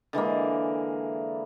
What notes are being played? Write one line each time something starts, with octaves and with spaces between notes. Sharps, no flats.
D3 E3 G#3 A#3